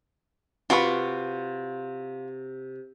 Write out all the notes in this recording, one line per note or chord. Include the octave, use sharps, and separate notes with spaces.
C3 F4 F#4 B4 C#6 D6